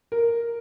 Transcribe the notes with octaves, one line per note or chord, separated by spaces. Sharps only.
A#4